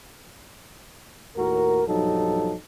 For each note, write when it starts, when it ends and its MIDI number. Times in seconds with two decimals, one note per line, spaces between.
1.36 1.82 39
1.36 1.82 45
1.36 1.82 66
1.36 1.82 70
1.87 2.55 35
1.87 2.55 43
1.87 2.55 53
1.87 2.55 54
1.87 2.55 63
1.87 2.55 69